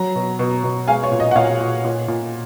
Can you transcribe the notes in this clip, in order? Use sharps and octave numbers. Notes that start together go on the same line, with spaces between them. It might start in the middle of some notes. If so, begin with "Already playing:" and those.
Already playing: F#3 A#5
B2
B2
B2
G#3 F5 G#5
C#5
A#2
D#5
F#5
A#2 C#5 F5
A#2
A#2
A#2